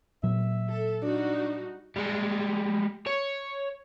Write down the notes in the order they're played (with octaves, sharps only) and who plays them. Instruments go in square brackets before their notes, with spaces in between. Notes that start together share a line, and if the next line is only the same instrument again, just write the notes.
[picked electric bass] A#2 F#3 [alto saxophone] E5
[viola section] A4
[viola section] G3 D#4 F#4 [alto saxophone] D4
[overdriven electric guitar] G3 G#3
C#5